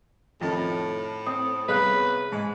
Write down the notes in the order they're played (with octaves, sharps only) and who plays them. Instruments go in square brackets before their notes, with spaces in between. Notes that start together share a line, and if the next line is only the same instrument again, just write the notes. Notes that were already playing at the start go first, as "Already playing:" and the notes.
[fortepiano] F2 D#3 A5 [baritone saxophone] A2
[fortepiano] C4 [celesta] D#6
[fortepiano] C2 B3 F5 [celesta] G#4 C#5 F#6 [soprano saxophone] B4
[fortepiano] G#2 [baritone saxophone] G#3